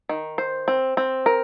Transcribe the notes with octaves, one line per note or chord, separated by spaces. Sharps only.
D#3
C5
C4
C4
A#4